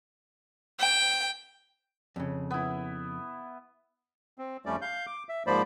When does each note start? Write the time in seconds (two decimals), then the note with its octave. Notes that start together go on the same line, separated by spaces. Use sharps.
0.80 G5
2.16 F2 C#3
2.51 B3 E4
4.38 C4
4.66 F2 G3 A3 C#4 D5
4.82 F5 G6
5.07 D6
5.29 E5
5.47 G#2 F3 A#3 C5 D5 B5